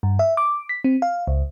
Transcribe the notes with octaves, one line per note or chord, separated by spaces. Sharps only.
G2
E5
D6
B6
C4
F5
C#2